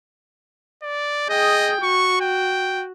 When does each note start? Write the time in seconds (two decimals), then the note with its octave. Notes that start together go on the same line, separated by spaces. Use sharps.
0.83 D5
1.29 G#4 D#5 G5
1.83 F#4 C#6
2.21 G5